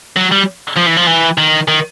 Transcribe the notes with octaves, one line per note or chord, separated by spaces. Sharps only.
F#3
G3
F3
E3
F3
E3
D#3
D#3